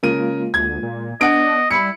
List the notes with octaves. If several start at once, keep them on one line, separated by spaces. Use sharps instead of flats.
C#3 G#3 A#3 F4 A#4 D#7
D2 G#6
A#2
B3 D4 D#5 F#5 D7
G3 E4 B5 C#7